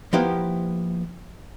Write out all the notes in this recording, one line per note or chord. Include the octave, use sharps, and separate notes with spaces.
F3 A#3 B3 E4 G4 C5